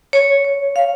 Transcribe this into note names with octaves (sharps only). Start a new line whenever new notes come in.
C#5
C#5
F5